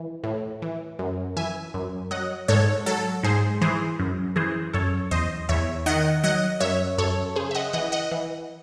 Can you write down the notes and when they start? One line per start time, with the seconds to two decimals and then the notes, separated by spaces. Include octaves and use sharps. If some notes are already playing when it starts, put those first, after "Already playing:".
Already playing: E3
0.24 A2
0.62 E3
0.99 F#2
1.36 E3 E5 G#5
1.74 F#2
2.11 F#3 D#5 F#5
2.48 G#2 A4 C#5
2.86 F#3 A4
3.23 G#2 G#4 C5
3.61 E3 G#4 C5
3.99 F#2
4.36 E3 G#4 C5
4.73 F#2 A4 C#5
5.11 E2 C5 D#5
5.49 E2 C#5 E5
5.86 D#3 D#5 F#5
6.24 F#3 D#5 F#5
6.60 F#2 C#5 E5
6.98 F#2 A4 C#5
7.36 C#3 G#4 C5
7.51 E5
7.55 D#5 F#5
7.73 E3 D#5 F#5
7.92 D#5 F#5
8.12 E3